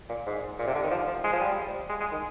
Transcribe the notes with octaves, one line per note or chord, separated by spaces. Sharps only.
A#2
G#2
A#2
C3
D3
D#3
F3
F3
G#3
F3
G3
G#3
G#3
D#3